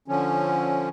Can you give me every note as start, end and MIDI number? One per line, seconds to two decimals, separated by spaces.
0.08 0.89 50
0.08 0.89 53
0.08 0.89 61